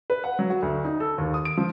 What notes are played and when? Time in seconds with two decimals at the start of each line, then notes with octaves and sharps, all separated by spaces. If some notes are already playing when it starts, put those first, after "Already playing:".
0.10 B4
0.24 F#5
0.39 F#3
0.50 F#4
0.62 D2
0.85 D#4
1.00 A4
1.18 D#2
1.34 D#6
1.45 D7
1.57 F3